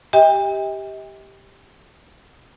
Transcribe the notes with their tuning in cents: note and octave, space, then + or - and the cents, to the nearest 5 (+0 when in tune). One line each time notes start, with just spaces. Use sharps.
G4 +0 D#5 +45 G5 +40